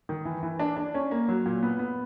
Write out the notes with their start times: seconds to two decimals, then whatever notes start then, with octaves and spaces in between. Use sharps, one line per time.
0.09 D#3
0.25 E3
0.43 E3
0.59 D4
0.77 D4
0.94 C#4
1.11 A#3
1.28 F#3
1.46 A#2
1.63 B3
1.79 B3